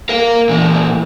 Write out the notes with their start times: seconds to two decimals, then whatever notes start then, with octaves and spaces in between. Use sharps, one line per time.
0.09 A#4 F5
0.49 A#2 E3